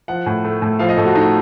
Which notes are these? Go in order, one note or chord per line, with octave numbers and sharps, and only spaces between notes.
F3 F#5
A2
A3
A2
F3 F5
D#5
A2 A4
F#4
A3 D#4